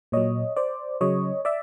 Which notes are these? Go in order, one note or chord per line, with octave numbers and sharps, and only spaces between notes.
A#2 F#3 C#5 D#5
C5 D5
C#3 F#3 C#5 D#5
D5 E5